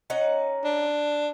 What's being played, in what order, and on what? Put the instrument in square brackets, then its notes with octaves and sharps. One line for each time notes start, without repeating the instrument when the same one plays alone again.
[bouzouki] C#4 D#4 F#5
[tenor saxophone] D4